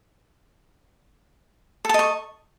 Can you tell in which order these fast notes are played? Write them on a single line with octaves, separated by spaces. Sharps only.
A4 A5 D#5 C#6